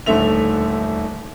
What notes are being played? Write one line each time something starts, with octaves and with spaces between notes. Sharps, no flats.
D#1 D3 D#3 A3 E5 F7